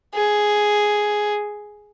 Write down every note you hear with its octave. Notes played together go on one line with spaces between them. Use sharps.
G#4